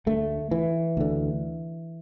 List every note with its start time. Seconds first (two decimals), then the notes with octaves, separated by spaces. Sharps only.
0.06 D2 D3 A3
0.51 E3
0.97 D2 D3